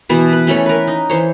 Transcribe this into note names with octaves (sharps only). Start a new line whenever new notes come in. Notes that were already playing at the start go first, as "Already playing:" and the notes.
B2 E3 B3
B4
E3 A3 C#4 C#5
A#4 B4
D#4
E3 C5 C#5